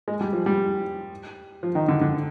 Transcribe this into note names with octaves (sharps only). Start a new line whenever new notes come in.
G#3
G3
F3
G3
F3
D#3
D3
D3